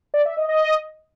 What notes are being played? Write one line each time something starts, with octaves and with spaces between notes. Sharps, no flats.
D5
E5
D#5
D#5